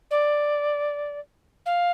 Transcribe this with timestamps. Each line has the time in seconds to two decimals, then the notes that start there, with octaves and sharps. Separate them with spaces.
0.10 D5
1.65 F5